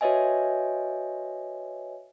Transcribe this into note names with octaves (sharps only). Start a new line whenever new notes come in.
F#4 B4 C#5 D#5 E5 G#5